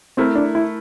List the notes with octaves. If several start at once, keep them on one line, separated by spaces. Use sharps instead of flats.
A3 C4 E4 A#4
D4
E4